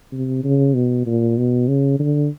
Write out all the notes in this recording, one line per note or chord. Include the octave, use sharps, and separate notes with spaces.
C3
C#3
B2
A#2
B2
C#3
D3